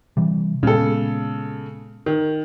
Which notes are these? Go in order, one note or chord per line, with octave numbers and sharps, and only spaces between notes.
C3 E3 G3
A#2 C#3 G#3 B3 A4
D#3